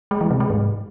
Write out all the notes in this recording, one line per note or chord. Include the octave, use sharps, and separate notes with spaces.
G#3
E3
C3
G#3
G#2